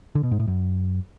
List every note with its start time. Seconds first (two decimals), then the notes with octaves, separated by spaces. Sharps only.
0.15 D3
0.23 B2
0.31 G#2
0.39 A2
0.47 F#2